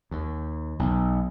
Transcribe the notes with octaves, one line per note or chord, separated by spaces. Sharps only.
D#2
B1